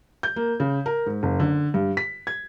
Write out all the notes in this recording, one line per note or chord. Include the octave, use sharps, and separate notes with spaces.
G6
A#3
C#3
A#4
G#2
F#1
D3
G2
B6
G#6